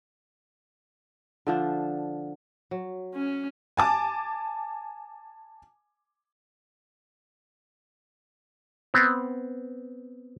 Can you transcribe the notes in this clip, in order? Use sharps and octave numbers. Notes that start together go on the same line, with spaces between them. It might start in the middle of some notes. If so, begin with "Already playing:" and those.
D3 F3 D4
F#3
C#4
G#5 A5 D6
B3 C4